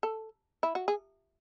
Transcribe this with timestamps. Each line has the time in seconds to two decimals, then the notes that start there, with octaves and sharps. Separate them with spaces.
0.03 A4
0.63 E4
0.75 F#4
0.88 G#4